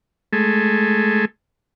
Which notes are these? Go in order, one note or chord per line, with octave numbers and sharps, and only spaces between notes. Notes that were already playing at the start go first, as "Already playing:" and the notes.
G#3 A3